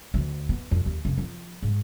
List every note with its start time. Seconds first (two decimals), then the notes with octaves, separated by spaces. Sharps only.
0.14 D2
0.49 B3
0.71 F2
0.86 D#2
1.05 F1
1.18 F3
1.63 G#2